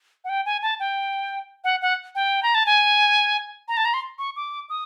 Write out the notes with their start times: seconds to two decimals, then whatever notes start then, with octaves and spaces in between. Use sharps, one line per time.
0.24 F#5
0.29 G5
0.46 G#5
0.62 A5
0.80 G5
1.64 F#5
1.82 F#5
2.15 G5
2.43 A#5
2.55 A5
2.66 G#5
3.68 A#5
3.77 A5
3.85 A#5
3.94 C6
4.19 C#6
4.36 D6
4.70 D#6